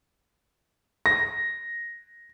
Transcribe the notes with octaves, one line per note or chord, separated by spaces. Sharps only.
A#6